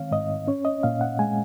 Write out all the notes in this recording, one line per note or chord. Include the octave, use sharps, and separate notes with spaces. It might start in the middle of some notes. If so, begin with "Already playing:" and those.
Already playing: D#3 G#3 C4 C#5 F5
G#2 D#5
C#4 C#5
D#5
A#2 F5
F#5
G#3 G#5